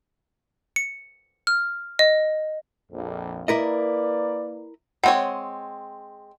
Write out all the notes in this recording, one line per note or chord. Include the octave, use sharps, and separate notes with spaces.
C#7
F6
D#5
A#1 F2
A#3 E4 A#4 B4 D5 D#5
G#3 C4 C#5 F#5